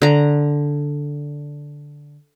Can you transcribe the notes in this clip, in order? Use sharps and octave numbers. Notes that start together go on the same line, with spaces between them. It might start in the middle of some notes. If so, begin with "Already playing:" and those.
D3 A#5